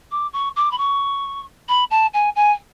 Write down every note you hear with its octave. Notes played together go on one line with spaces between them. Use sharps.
D6
C#6
D6
B5
C#6
B5
A5
G#5
G#5